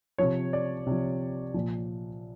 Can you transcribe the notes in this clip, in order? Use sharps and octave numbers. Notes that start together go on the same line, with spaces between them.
C3 F3 C#5
D5
C3 F3
A#2 F3